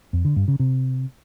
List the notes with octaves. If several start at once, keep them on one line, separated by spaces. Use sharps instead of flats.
F2
D3
G2
C#3
C3